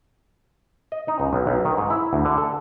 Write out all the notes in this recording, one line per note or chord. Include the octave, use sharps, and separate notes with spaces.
D#5
D#4
C#2
B1
B1
D#3
G#2
E4
D2
D3
A4